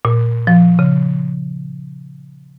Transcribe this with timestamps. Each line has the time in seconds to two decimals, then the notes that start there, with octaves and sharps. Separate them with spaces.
0.05 A#2
0.47 F3
0.79 C#3